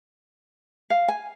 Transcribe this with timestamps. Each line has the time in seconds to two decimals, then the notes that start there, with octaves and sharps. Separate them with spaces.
0.90 F5
1.08 G#5